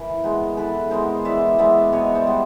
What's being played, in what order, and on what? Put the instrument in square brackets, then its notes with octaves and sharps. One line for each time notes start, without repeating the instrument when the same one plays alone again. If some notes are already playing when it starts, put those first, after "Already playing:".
Already playing: [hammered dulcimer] E3 A#4
G#3 B3 D#4
E3 A4 B4
G#3 B3 D#4 A#4 C5
E3 D5 E5
G#3 B3 D#4 D5 E5
B2 C#5 D#5
C5 D5
G3 B3